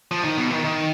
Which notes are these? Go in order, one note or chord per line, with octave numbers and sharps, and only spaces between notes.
F3
D#3
B2
D#3
D#3